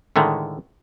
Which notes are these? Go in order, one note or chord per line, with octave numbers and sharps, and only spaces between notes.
A2 D3 D#3 G#3 A3